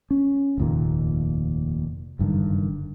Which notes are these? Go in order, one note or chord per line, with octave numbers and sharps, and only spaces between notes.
C#4
F1 D#2 A#2
F#1 G2 D3 D#3